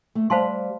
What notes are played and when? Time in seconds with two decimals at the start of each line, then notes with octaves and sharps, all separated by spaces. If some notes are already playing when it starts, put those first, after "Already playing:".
0.15 A3
0.30 G3 C5 F5 A5 C6